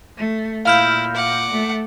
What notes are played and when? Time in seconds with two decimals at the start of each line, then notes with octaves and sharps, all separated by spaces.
0.17 A3
0.65 A#2 E4 F5 F6 G6
1.16 F#5 D6
1.50 A3